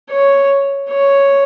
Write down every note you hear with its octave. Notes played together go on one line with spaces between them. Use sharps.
C#5
C#5